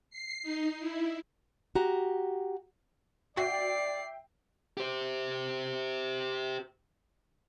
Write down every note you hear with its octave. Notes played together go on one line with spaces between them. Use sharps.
C7
D#4
E4
F#4 G4 A#5
F#4 D5 E5 G5 C7
G4 C5